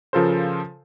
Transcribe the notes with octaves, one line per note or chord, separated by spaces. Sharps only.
C#3 F3 F4 A4 A#4 C5